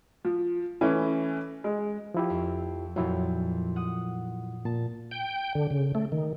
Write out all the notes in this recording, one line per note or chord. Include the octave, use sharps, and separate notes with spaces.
F3
E3 A3 C#4 E4
G#3
F3 E4 G4
F2
F2 A#2 F3 F#3 E4
F#5 D#6 F#6
A#2 A5
G5
D3
C#3
A3
D#3